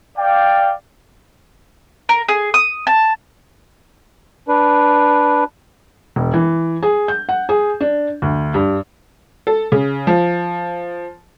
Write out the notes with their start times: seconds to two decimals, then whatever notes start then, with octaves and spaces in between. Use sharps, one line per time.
0.18 D5 F5 G5
2.09 A#4
2.28 G#4
2.54 D#6
2.87 A5
4.48 D4 B4
6.16 E1
6.34 E3
6.83 G#4
7.08 G6
7.29 F#5
7.49 G#4
7.81 D4
8.22 D2
8.54 G2
9.47 A4
9.72 C#3
10.07 F3